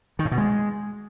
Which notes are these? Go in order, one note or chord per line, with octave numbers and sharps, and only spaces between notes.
D#3
A2
B2
G#3